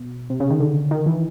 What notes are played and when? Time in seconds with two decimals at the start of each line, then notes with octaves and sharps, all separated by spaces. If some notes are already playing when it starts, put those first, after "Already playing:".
Already playing: B2
0.30 C3
0.40 C#3
0.50 D#3
0.60 D3
0.91 D#3
1.06 E3